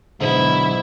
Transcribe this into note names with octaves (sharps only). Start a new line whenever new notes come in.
G#2 B2 D3 F#3 E4